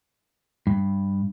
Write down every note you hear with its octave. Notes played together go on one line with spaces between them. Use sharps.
G2